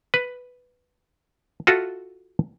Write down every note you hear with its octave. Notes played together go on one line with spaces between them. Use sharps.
B4
F4 F#4 A4 E5